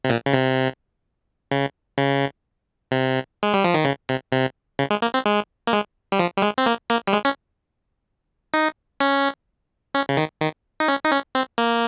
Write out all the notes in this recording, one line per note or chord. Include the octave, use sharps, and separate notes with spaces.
C3
A#2
C#3
C3
C#3
C#3
C3
G#3
G3
F3
D#3
C#3
C3
C3
C#3
G#3
A#3
C4
G#3
A#3
G#3
G3
F3
G3
G#3
C4
A#3
A#3
G3
G#3
C#4
D#4
C#4
C#4
C#3
D#3
D#3
D#4
C#4
D#4
C#4
C4
A#3